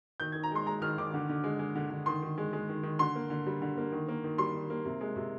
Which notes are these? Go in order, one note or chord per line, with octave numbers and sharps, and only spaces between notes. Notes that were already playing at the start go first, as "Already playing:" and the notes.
D#3 G6
D#3 G#6
A#5
G#3 C6
G#3 A#5
D#3 F6
D#3 D6
D3
D3
G#3
G#3
D3
D3
D#3 C6
D#3
G#3
G#3
D#3
D#3
D3 C6
A#3
D3
G3
D3
A#3
D#3
A#3
D#3
G3 C6
D#3
A#3
C3
G#3
C3